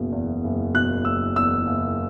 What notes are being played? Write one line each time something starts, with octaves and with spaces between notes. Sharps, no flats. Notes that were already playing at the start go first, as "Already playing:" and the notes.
Already playing: F#1 B2
E2
F#1
B2 F#6
F#1 E6
E2 E6
F#1